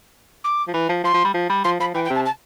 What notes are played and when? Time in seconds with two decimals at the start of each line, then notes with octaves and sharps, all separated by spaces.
0.44 D6
0.67 F3
0.73 E3
0.89 F3
1.03 F3 C6
1.14 F3
1.24 G3
1.34 F3
1.49 G3
1.64 F3 C6
1.79 F3 B5
1.94 E3 G5
2.04 G5
2.10 C3 A5
2.25 A5